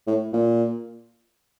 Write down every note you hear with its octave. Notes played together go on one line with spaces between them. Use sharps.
A2
A#2